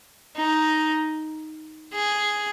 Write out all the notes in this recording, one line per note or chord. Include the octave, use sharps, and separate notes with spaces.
D#4
G#4